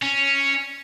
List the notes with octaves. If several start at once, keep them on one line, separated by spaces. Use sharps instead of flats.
C#4